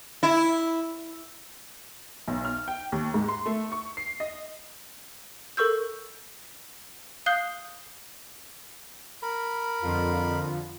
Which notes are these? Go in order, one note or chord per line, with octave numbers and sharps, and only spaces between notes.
E4
B1
F6
G5
D#2
G#2
C6
A3
C#6
C7
D#5
A4 A#4 C#6 E6 G6
F5 D#6 F#6 G6 C7 G7
A#4 B5
F2 D3 F3 F4